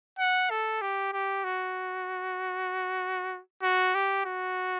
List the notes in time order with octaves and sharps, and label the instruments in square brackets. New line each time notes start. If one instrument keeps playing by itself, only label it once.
[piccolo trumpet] F#5
A4
G4
G4
F#4
F#4
G4
F#4